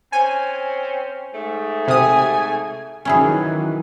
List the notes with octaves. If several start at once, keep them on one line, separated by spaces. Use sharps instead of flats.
C4 C#4 C5 G#5
G#2 A3
C3 G#5 D#6
D#3 E3 F#3 C#4 E4 G#4